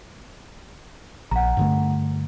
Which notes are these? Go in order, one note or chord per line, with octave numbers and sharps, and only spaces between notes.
A#1 F#5 A#5
G2 D3 A3